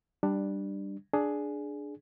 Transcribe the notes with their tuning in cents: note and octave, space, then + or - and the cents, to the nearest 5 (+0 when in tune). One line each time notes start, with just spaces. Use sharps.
G3 +0 D4 +10
D4 +0 G#4 +10